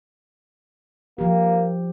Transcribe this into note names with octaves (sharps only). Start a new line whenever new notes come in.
F3 A#3 G4